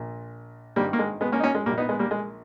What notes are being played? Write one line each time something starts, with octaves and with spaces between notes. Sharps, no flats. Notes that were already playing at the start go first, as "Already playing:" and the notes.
Already playing: A#1 A#2
G#1 G2 D#3 G3 A#3
A#3
G#3
G#3 B3
A#3 C#4
D#4
A#3 C#4
G#3
A#1 A#2 G3 A#3
B3 D#4
G#3 B3
G3 A#3
G#3